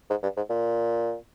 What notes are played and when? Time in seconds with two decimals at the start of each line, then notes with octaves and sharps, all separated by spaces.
0.10 G#2
0.22 G2
0.36 G#2
0.49 A#2